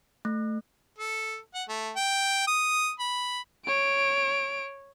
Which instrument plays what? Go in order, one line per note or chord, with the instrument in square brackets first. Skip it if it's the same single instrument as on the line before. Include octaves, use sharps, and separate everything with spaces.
[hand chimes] A3
[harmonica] A4
F#5
A3
G5
D#6
B5
[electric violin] C#5 D7